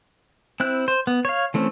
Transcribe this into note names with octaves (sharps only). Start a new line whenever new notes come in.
C4 E4 F#6
C5
B3
C#5 F5
E3 A3 C4 C#4